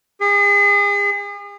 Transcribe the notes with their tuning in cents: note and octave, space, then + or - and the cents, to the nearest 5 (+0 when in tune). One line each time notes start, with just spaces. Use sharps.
G#4 -40